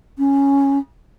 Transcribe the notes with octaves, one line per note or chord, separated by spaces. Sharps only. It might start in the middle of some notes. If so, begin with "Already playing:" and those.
C#4